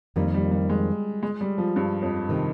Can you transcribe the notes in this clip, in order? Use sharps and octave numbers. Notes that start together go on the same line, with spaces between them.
F2 D#3 G3 A#3
G3
G3
G#3
G#3
G3
F3
G2
F2
C3 D#3